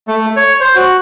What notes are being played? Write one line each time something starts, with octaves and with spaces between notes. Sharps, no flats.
A3
C#5
C5
F#4